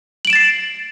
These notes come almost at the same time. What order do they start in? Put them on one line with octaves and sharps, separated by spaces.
F#7 D7 E7 A6 C7